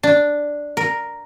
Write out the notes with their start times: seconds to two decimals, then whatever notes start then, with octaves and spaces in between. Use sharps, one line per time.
0.03 D4
0.77 A#4